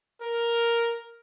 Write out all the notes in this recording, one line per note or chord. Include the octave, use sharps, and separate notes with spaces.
A#4